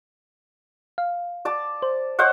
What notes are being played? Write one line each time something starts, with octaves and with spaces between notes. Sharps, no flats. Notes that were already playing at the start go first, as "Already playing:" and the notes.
F5
D5 A5 D6
C5
C5 C#5 D#5 F5 F#5 C#6